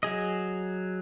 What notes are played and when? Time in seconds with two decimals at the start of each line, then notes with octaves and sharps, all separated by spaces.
0.03 F#3 G#4 D#5